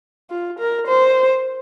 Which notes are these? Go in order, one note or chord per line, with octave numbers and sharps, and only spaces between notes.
F4
A#4
C5